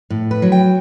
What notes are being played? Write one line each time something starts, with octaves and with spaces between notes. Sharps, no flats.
A2
B4
F#3
G5